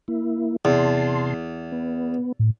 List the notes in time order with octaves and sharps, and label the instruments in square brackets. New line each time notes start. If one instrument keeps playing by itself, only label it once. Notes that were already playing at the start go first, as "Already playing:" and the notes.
[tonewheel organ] A#3 E4
[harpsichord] E2 [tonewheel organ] C3 A5 C6
[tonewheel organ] B3
[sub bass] A2